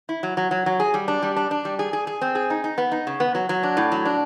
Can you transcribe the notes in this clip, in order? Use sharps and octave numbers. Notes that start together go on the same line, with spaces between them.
E4
F#3
F#3
F#3
F#3
G#4
G3
D4
G3
D4
D4
G3
G#4
G#4
G#4
C4
G#4
D#4
D#4
B3
D#4
C#3
B3
F#3
F#3
D4
A2
F#3
D4